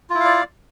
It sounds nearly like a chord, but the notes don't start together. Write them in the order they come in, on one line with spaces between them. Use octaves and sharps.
F4 E4 F5 D5